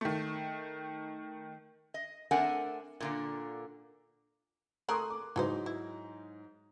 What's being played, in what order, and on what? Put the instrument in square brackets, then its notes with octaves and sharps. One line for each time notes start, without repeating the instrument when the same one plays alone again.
[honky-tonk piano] D#3 A3
[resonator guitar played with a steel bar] D#5
A3 C4 D4 A#4 F#5 G#5
A#2 D3 A#3
[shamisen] A3 G#4 A#4 [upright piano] C6 D#6 F#6
[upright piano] D6
[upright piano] G#2 F#3 D#4 [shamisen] E3 A4 C5
[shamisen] E4